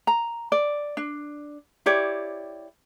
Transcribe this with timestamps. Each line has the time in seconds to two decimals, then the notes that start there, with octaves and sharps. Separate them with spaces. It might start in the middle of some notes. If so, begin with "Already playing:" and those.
0.07 A#5
0.52 D5
0.97 D4
1.86 E4 G4 C#5 D5